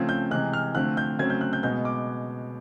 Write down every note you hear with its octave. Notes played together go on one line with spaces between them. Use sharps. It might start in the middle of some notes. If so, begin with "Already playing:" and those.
Already playing: C#3 F3 A3 C4 G#6
G6
C3 E3 G#3 F#6
F6
D3 F3 A3 C4 F#6
G6
C#3 F#3 A3 C4 G#6
G6
F#6
G6
B2 G#3 B3 G6
D6